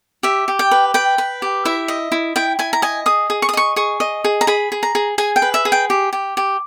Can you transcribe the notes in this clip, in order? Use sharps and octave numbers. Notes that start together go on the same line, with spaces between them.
G4 E5
G4
G5
B4
B4 G5
B4
G4
E4 E5
D#5
E4
E4 G5
E4 G#5
A#5
D#5 G#5
G#4 D#6
G#4
C#6
D#6
D#5 C#6
G#4 C#6
D#5
G#4
A#5
G#4 B5
G#4
A#5
G#4
G#4 G#5
G5
B4
E5
G#4
G5
G4
G4
G4